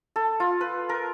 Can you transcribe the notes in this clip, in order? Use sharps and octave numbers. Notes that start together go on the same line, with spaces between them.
A4
F4
B4
A#4